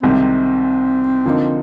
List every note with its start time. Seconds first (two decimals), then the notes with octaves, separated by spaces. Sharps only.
0.02 C2 C3 D#3 G#3 C4
1.25 D3 F3 A#3 D#4